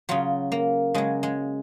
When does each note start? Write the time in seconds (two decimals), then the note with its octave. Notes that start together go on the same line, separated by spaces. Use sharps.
0.09 C#3 F#3 F4
0.52 A#3
0.94 C#3 F#3 G#3
1.23 G#3